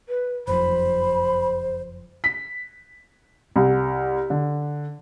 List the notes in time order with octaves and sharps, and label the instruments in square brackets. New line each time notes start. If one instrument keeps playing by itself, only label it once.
[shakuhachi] B4
[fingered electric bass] F#1 F2 [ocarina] C5 [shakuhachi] B5
[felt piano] B6
C2
D3